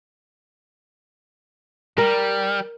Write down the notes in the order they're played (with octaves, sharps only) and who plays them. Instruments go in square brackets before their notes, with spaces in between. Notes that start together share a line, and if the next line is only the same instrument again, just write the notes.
[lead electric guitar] G3 [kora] A#4